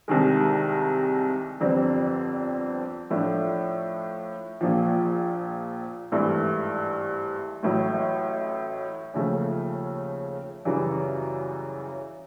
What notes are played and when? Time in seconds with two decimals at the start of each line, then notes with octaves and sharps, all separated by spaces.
0.08 C2 C3 D#3 G#3
1.60 G1 F2 D3 G3 C4
3.10 A2 F3 A3 D4
4.61 A#1 A#2 F3
6.12 G#1 G2 E3 A3
7.63 A1 A2 F#3
9.14 D#2 C#3 F3 A3 C#4
10.65 F#2 C#3 E3 G3